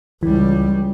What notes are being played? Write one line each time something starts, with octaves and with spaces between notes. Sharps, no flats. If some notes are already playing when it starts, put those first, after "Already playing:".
C#2 E3 G3